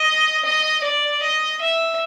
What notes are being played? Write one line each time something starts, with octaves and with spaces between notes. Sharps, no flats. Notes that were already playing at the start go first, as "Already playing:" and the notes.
Already playing: D#5
D#5
D5
D#5
E5